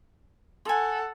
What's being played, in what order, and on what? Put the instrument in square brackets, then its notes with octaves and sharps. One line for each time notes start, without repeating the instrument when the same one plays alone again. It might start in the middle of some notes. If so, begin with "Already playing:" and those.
[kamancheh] A4 F#5 [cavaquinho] G#5 C6